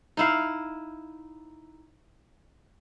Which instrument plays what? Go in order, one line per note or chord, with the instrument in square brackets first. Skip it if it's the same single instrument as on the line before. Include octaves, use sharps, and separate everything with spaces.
[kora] D#4 E4 F5